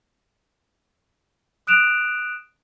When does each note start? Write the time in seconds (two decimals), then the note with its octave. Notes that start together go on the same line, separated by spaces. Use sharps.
1.67 D#6 F#6 D7 E7 F7